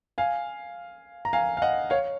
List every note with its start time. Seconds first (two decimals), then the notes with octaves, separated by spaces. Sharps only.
0.18 F5 G#5
1.25 A#5
1.33 F5 G#5
1.57 F5
1.62 D#5 F#5
1.90 C#5 F5